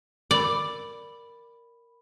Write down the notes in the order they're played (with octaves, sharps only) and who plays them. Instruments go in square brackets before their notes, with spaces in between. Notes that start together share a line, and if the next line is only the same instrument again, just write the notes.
[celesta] A#4 B5 [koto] D5